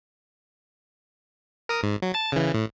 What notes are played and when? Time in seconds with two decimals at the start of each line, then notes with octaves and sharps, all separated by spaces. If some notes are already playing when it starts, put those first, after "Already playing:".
1.69 A#4 D#6
1.83 G#2
2.02 F#3
2.14 A5 A6
2.32 C#3 E3
2.54 A2